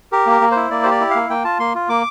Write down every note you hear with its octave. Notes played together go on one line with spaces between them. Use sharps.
G4 A#4
A#3 A#4
A#3
E4 C5
A#3 D5
G4 C5
D5
E4
F5
A#3
A#3 G5
F4 A5
A#3 C6
F4
A#3 D6